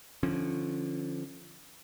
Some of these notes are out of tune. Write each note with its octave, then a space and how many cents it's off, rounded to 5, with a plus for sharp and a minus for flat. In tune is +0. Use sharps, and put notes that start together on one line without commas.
D3 +0 F3 -15 C#4 -20